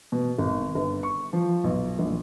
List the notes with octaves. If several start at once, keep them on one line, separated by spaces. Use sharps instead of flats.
B2
G#1
G1
C#6
F3
B1
A#1